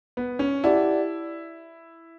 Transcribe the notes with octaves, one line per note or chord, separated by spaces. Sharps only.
B3
C#4
E4 G4 D5 F#5 A5